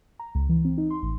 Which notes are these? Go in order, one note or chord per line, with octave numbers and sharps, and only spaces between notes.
A#5
C#2
E3
C4
D#4
C6
A1